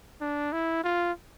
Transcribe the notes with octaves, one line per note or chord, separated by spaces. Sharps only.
D4
E4
F4